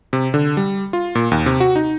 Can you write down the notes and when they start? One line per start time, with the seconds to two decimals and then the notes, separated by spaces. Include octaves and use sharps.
0.13 C3
0.34 D3
0.57 G3
0.93 F4
1.15 A#2
1.31 D#2
1.46 C3
1.60 F#4
1.76 D#4